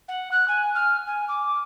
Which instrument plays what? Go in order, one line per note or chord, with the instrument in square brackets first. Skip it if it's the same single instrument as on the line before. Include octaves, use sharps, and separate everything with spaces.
[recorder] F#5
F#6
G#5
F6
G#5
D6